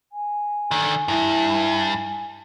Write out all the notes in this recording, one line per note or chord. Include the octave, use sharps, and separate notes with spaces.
G#5
D3 D#3
G2 E4